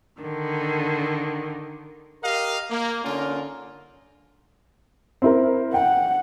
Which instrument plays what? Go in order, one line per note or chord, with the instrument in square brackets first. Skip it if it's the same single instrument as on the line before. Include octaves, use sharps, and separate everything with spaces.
[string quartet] D3 D#3
[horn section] G4 A#4 D#5 F5
A#3
D3 C#4 D#4 F4 A#4
[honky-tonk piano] C4 E4 A#4
[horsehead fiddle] F#5 [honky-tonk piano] G5